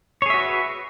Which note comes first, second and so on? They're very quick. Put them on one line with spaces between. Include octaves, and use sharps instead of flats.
C#5 G#4 E5 F#4 B4